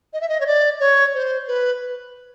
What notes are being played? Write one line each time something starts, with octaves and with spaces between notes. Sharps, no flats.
D#5
E5
D#5
C#5
D5
C#5
C5
B4